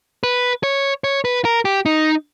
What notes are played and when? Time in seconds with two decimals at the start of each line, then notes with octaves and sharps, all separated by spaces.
0.23 B4
0.63 C#5
1.04 C#5
1.25 B4
1.45 A#4
1.65 G4
1.86 D#4